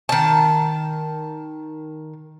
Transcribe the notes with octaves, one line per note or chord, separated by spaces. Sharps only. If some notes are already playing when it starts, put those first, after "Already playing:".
D#3 A5